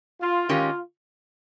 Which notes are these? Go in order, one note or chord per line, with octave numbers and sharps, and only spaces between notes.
F4
D#3 G#3 C#4 F4 G4 A#4